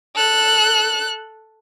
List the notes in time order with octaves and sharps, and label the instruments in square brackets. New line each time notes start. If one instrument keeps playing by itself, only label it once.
[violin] A4 F#6